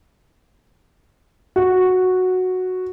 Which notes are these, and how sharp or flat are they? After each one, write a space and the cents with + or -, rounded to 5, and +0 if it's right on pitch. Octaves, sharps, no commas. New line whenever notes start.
F#4 -5